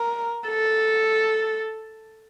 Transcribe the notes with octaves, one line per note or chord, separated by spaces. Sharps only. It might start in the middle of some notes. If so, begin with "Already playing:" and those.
Already playing: A#4
A4